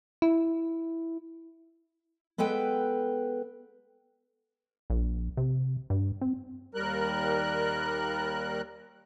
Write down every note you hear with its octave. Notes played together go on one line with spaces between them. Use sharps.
E4
G#3 B3 A4 B4 G5
A#1
C3
G2
C4
D#2 G3 A#4 F#6